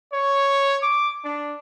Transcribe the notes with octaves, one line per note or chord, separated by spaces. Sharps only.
C#5
D6
D4